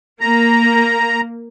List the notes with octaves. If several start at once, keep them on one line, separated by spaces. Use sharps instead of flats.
A#3 A#5